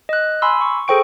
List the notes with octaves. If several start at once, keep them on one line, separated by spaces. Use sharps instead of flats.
D#5 F#6
G#5 B5 C6 E6
C#6
G#4 A4 C5 G5 C#6 D7